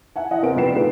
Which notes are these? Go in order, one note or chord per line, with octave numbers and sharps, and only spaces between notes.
E5 F#5 G#5
E3 D#5 F#5
C3 C4 A#4 D7
G2 F3 B4 G5 C7 E7
G#2 D3 A3 D4 F4 B4